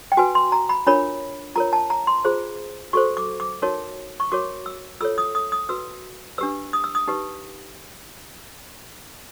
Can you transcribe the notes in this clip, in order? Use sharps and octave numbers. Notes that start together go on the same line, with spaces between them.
G5
F#4 B4 G#5
C6
A#5
B5
D4 F4 A#4 C#5 B5
F4 A#4 C#5 A#5
A5
A#5
C6
F4 G#4 C5
F#4 A4 C5 C#6
D6
D6
D#4 F#4 A#4 C#5
C#6
F#4 A#4 C#5 D6
E6
F4 A4 C#5 E6
D#6
D#6
D#6
F#4 B4 E6
D4 G4 B4 E6
D#6
E6
D#6
D#4 G4 B4